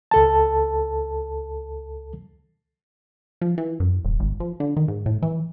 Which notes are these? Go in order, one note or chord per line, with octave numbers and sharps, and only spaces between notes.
C#2 A4 A5
F3
E3
F#2
D#1
G#1
F3
D3
D#3
G#2
A2
E3